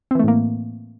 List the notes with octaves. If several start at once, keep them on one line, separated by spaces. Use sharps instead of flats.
A2 E3 A3 A#3 C4